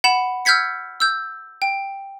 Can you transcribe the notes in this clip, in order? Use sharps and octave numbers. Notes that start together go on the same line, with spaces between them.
F#5 B5 E7
E6 F6 G6 G#6 B6 C#7
E6 G6
G5